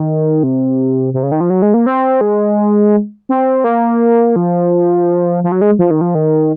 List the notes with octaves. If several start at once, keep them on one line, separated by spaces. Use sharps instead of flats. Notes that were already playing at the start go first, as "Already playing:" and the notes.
Already playing: D#3
C3
C3
C#3
D#3
F3
F#3
G#3
A#3
C4
G#3
C4
A#3
F3
F3
F#3
G#3
F3
D#3
F3
D#3